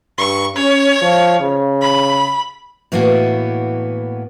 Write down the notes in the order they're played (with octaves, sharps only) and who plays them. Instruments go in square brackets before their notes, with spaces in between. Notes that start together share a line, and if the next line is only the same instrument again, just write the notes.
[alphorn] G2 [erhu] C#6
[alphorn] C#4 [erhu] C#5
[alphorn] F3
C#3
[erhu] B5
[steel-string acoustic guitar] A2 E3 A#3 B3 F#4